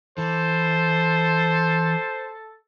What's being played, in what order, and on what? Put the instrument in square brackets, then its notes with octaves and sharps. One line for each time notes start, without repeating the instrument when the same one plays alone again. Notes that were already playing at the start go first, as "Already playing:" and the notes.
[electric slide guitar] E3 [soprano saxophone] A4 [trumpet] C5